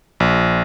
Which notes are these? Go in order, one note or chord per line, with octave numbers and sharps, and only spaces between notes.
A#1